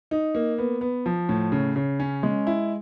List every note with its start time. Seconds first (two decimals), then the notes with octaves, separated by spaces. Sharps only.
0.11 D#4
0.35 A#3
0.58 B3
0.81 B3
1.06 F3
1.29 A2
1.52 C#3
1.76 C#3
2.00 C#4
2.23 G#3
2.47 E4